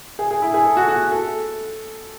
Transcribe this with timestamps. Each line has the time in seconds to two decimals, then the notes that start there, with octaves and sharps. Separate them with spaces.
0.19 G#4
0.31 G#4
0.42 E4
0.54 G#4
0.65 A4
0.77 F#4
0.89 F#4
1.12 A4